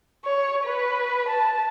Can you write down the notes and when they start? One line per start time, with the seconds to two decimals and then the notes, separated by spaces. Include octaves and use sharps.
0.25 C#5
0.64 B4
1.29 A5